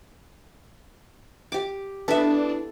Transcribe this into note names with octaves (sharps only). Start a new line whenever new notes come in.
G4 D6
B3 D4 E4 A4 E5